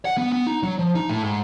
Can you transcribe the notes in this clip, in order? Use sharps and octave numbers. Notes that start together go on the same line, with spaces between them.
F#5
B3
B3
D#4
F#3
F3
D#4
A2
G#2